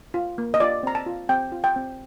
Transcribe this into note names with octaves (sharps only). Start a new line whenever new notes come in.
F4
A#3
D#5
F4 D5
C4 A#5
A5
F4
C4 G5
F4
G5
C4